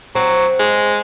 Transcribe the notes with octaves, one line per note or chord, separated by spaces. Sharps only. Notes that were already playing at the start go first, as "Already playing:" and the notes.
F#3 C4
G#3